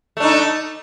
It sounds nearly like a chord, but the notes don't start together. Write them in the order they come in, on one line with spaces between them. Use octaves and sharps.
A3 D4 D#4